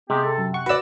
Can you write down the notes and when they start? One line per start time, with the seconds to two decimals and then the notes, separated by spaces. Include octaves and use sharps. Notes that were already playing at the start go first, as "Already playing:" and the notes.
0.10 C3 G#3 B3 G4
0.23 A4
0.38 F#2
0.54 F#5 C#6
0.66 F#4 B4 D5 E6